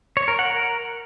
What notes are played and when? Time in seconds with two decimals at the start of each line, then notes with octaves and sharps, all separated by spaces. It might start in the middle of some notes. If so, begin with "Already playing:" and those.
0.17 C#5
0.28 A#4
0.39 F#5
0.50 A#4